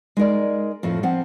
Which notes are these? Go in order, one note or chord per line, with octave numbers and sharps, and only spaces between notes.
G#3 D#4 A#4 D5
F2 A2 F3 A3
F3 C4 F#5